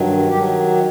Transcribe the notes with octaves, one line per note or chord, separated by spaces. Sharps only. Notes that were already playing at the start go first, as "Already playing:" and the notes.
Already playing: G2 D#3 F#3
D#3 F#3 G4